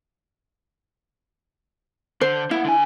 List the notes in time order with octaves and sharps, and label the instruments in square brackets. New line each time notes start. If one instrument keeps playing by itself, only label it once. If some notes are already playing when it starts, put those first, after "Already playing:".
[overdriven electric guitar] D3 [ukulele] C5
[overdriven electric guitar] A#3 F#5 [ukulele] E4
[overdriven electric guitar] D3 G#5